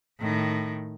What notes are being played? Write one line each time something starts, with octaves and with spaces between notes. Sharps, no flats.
A2 D#3